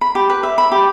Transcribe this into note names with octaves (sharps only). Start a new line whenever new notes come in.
B5
G4
B4
E5
B5
G4